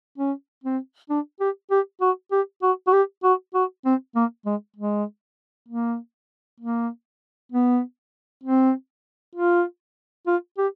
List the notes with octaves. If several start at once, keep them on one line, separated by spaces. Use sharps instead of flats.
C#4
C4
D4
G4
G4
F#4
G4
F#4
F#4
G4
F#4
F#4
C4
A#3
G#3
G#3
A#3
A#3
B3
C4
F4
F4
G4